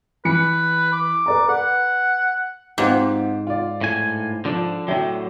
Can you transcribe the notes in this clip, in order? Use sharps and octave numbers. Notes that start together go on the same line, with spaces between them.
E3 B4 C#7
D6
B4 D5 A#5
B4 F#5
G#2 C4 F4 G4
F4 D5
A2 G#5
D3 F3 D4
A2 D3 F#3 E5 G5